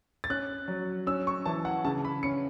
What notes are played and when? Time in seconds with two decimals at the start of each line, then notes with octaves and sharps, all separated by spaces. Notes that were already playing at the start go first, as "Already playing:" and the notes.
0.24 A6
0.30 C#4 F#6
0.68 F#3
1.07 C#4 E6
1.27 C#6
1.46 E3 A5
1.65 F#5
1.85 C#3 A5
2.05 B5
2.23 C#4 C#7